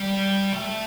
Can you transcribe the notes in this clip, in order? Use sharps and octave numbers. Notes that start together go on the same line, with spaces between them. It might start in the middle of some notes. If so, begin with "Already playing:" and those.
Already playing: G3
A3